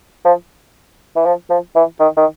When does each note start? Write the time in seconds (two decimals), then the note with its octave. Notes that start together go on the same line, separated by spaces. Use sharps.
0.25 F3
1.16 E3
1.25 F3
1.50 F3
1.76 E3
2.00 D#3
2.17 D#3